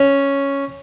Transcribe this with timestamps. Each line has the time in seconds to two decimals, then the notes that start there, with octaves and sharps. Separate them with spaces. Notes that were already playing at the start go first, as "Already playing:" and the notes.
Already playing: C#4